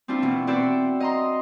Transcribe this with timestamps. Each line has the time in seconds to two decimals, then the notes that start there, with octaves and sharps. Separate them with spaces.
0.08 C4 D4 E4 F4
0.22 B2 E3
0.47 C4 E4 F#4 C5 D5 E5
1.00 D#5 A#5 C6